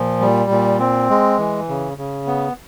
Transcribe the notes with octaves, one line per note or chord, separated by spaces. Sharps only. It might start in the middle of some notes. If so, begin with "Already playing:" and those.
Already playing: A#2 F3
G3
A#2
C4
G#3
E3
C#3
C#3
B3